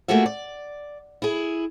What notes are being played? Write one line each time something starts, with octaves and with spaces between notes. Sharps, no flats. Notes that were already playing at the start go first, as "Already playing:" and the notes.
A3 A#3 F4 F#4 G#4 E5
D5
E4 G#4